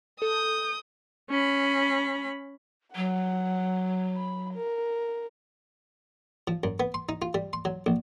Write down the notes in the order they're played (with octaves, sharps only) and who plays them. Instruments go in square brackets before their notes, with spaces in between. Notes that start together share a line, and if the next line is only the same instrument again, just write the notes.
[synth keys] A4 [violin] D#6 G6
[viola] C#4 B5
[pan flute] F#3 [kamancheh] F#5
[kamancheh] B5
A#4
[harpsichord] F3
F#2
B3
C6
D#4
F4
G3
C6
F#3
A#1